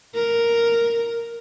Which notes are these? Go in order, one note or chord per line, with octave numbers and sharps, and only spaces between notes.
A#4